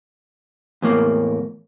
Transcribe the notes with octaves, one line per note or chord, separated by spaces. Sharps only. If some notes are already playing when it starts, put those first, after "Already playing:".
E2 A2 A#3